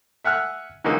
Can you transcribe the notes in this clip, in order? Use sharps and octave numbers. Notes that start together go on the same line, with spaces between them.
E5 F#5 G#5 F6 F#6
D3 E3 F#3 G#3 A#3 D#4